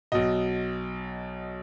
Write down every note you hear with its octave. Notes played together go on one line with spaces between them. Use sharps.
B1 B2 D#5